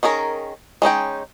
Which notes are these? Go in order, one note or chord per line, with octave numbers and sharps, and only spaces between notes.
D#3 C#4 G#4 A#4
G#3 C#4 D#4 G5